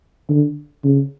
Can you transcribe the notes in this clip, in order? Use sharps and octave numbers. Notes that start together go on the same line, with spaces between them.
D3
C#3